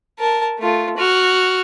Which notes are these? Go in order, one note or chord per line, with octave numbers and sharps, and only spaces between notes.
A#4 A5
A3 F4
F#4 F6